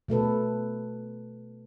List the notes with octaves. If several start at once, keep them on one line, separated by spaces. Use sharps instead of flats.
B2 A3 A4 B4